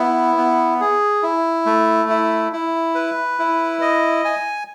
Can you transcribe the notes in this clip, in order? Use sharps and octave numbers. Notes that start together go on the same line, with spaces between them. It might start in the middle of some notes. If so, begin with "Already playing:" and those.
Already playing: B3 E4
B3
G#4
E4
A3
E4
E4
B4
E4
D#5
G#5